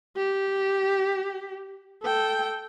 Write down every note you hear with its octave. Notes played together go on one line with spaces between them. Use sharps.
G4
A4 G5